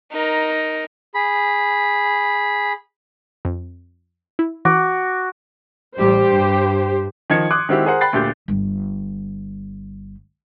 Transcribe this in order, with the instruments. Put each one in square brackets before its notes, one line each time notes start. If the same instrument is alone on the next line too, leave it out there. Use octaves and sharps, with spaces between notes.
[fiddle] D#4 A#4
[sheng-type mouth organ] G#4 B5
[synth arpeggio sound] F2
E4
[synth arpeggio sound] E3 [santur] F#4 D6
[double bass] A1 G3 [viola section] G4 C5
[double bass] G2
[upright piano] D#3 F3 G#6 C#7
C6 D6 D#6 F#6
D#3 G#3 C4 E4 F#4 G4
G#4 A#4 C5 F#5
G5 B5 F#6 A6 C7
D2 A#2 G4 G6
[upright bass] G1 G3